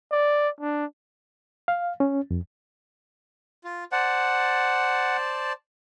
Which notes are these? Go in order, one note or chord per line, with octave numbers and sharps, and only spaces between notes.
D5
D4
F5
C#4
F2
F4
C5 D5 F#5 A5